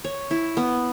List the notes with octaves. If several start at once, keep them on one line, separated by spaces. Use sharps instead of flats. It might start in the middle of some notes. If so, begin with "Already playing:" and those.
C#5
E4
B3